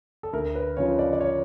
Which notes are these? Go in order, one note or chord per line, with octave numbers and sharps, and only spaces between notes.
A4
D2 A#4
B4
C#3 F3 C#5
D5
D5
C#5